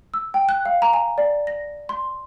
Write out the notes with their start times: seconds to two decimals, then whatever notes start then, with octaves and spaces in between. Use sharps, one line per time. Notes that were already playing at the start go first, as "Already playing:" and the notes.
0.14 E6
0.34 G5
0.49 F#6
0.65 F5
0.82 A#5
0.93 G#5
1.18 D5
1.47 A#6
1.89 C6